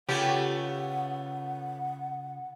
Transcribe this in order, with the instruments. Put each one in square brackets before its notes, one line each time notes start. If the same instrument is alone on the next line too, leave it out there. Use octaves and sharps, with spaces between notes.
[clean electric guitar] C#3 F4 G#4 [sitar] A3 B3 C#4 [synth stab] G4 [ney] F#5